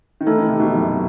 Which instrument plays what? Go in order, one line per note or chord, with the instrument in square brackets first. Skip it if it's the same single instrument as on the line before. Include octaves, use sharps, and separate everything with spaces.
[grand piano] D#3
[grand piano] E3 [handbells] A3 D#4 A4
[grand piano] D#3
C3
B2
F#2